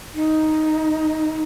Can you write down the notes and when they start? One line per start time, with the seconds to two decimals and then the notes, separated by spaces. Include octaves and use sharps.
0.14 D#4